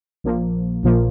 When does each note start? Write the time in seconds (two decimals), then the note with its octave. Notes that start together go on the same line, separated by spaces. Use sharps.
0.24 A#1 A#2 F3 A#3
0.83 A#1 A#2 F3 A#3